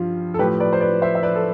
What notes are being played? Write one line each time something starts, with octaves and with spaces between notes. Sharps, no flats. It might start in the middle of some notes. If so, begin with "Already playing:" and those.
Already playing: G2 F3 F4
A4
A2 F3 G4 B4
B4 D5
C5
B4 D5
C5 E5
E5
B4 D5
A4